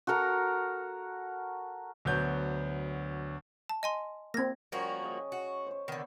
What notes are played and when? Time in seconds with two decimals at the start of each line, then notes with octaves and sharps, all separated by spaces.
0.07 F#4 A4 A#4 A#5
2.05 D2 F#3 B3 G6
3.69 A5
3.83 D#5 G#5 C6
4.34 A#3 C4 G#6 A#6
4.72 F3 G3 A#3 C#4 F#4 C#5
5.03 C#3 D#5
5.32 F#4
5.67 C5 C#5
5.88 D3 D#3 B3